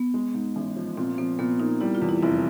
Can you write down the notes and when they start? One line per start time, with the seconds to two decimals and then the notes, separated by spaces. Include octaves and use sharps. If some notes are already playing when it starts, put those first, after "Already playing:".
Already playing: B3
0.14 G#3
0.34 G#2
0.56 A1
0.76 F3
0.97 A#2 C4
1.18 F3 C4
1.39 A#2 B3
1.60 A#3 D#4
1.81 G3 E4
1.95 F4
2.02 E2
2.09 E4
2.22 F1 E4